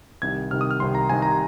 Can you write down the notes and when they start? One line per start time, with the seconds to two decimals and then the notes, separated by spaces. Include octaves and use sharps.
0.22 C2 C3 D#3 G#6
0.51 C2 C3 D#3 F6
0.61 D#6
0.71 F6
0.80 C2 C3 D#3 C6
0.95 A#5
1.09 C2 C3 D#3 G#5
1.22 A#5